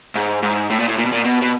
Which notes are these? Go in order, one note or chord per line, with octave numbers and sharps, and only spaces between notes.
G#2
G#2
A2
A#2
A2
A#2
B2
A#2
B2
B2